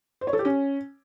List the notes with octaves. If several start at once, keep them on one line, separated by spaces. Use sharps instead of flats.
C5
C#5
A4
G4
C#4